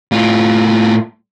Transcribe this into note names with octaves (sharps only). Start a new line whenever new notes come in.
A2 F4